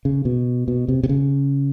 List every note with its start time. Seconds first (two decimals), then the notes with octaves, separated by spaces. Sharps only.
0.05 C#3
0.25 B2
0.68 B2
0.88 C3
1.03 C3
1.09 C#3